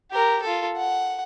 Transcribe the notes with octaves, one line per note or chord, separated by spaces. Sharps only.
G4 A#4
F4 A4
F#5